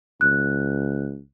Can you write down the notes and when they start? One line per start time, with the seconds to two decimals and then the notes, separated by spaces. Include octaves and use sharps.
0.21 C#2 F#6